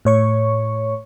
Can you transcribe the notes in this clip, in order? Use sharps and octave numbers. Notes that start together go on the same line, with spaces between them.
A2 C#5 C#6